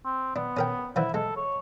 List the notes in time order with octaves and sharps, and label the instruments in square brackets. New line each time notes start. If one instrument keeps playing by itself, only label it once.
[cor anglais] C4
[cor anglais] B3 [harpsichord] D4
[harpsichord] C#4 A#4 G5
[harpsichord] D3 E3 F3 [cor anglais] E4
[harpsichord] G#3 [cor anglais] A4
[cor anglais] C#5